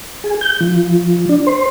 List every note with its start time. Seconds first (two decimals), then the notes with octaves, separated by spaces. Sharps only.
0.24 G#4
0.41 G6
0.61 F3
1.29 D4
1.47 C5